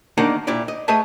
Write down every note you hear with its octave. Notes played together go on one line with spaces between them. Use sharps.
E2 D#3 A#3 D4 D#4 F#5
A#2 E4 G4 D5
D#5
A3 G#4 B4 D#5 E5 A5